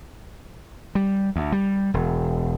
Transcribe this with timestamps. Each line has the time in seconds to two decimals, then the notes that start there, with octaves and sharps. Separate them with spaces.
0.95 G3
1.36 D2
1.52 G3
1.94 E1